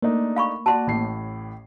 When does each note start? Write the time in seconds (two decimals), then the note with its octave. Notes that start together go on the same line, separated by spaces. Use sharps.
0.02 A3 A#3 D4 D#4
0.36 F5 B5 C#6
0.66 F#4 D5 A5 C6
0.87 A1 A2 C7